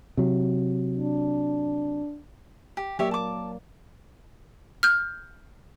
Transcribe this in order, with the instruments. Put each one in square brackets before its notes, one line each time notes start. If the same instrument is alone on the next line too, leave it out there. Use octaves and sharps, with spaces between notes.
[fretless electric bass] C3 F#3
[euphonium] D4
[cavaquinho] G4
[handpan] F#3 A#3 D5 [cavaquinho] G4 C#5 E5
[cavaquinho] A5 D6
[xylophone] F6 G6